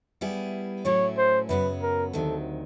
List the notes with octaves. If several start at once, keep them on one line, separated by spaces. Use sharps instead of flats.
G3 B3 E4 G#4
A2 F#3 A3 C#4 E4 C#5
C5
F#2 C#3 F#3 B3 B4
A#4
D2 C3 D#3 F#3 A4